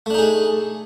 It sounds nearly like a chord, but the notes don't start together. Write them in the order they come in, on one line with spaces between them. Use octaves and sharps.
A3 D4 D#4 G#4